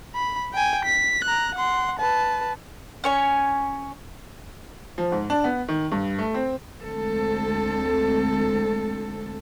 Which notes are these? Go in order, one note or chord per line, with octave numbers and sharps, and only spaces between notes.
B5
G5 G#5
B6
A#5 F#6
F#5 C6
B4 A5
C#4 C#5 G#5
F3
G#2
D4
B3
D#3
G2
A3
C4
D2 G#3 C4 A4